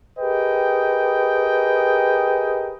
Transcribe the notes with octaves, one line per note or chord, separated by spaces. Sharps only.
G4 G#4 A#4 B4 D#5 G5